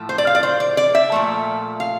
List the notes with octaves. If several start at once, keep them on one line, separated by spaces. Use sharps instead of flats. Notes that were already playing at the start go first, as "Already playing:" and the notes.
Already playing: A2 F3 A3
C5
D5
F5
D5
C5
D5
D5
E5
A#2 F3 A3
F5